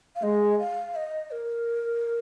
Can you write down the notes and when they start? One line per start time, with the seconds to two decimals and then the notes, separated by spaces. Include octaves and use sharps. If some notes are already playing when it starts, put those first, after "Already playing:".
0.16 F5
0.23 G#3 D#5
0.60 F5
0.95 D#5
1.31 A#4